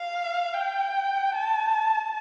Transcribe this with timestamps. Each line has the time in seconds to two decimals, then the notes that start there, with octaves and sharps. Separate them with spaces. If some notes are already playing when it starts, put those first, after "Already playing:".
Already playing: F5
0.54 G5
1.34 A5